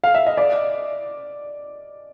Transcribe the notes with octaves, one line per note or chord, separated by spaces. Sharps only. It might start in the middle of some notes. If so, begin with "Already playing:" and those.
F5
E5
D#5
D5